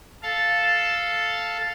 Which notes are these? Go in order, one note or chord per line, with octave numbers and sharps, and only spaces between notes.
A4 F5 A5